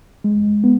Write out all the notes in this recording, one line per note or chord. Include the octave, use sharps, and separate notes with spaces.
G#3
B3